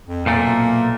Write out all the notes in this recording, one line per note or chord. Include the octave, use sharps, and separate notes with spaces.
F2
B1 A#2 A3 A#3